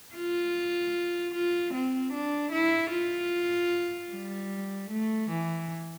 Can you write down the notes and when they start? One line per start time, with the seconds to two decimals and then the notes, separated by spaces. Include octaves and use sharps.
0.15 F4
1.34 F4
1.74 C4
2.13 D4
2.52 E4
2.92 F4
4.11 G3
4.90 A3
5.30 E3